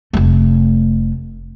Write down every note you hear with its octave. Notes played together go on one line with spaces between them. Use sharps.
F1 A3